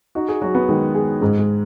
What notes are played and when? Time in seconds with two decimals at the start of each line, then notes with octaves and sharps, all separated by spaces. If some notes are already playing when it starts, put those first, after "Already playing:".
0.15 D#4 F#4
0.28 G#4
0.42 F#3 F#4
0.55 B3
0.69 D#3 G#3
0.95 G#4
1.21 G#2 G#3
1.39 G#3